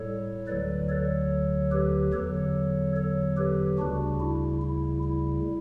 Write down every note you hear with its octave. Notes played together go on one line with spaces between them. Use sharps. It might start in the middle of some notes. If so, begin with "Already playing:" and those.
Already playing: A2 G3 A4 C#5
D2 D3 F#3 B4 D5
A4 C#5
G4 B4
E2 D3 F#3 A4 C#5
A4 C#5
G4 B4
D2 C#3 G3 D4 F#4
E4
E4
E4